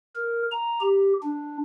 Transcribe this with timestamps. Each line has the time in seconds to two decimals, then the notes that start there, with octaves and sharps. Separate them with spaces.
0.16 A#4
0.52 A#5
0.81 G4
1.23 D4